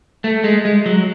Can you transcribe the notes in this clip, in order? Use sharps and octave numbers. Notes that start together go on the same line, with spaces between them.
A3
G#3
G#3
F#3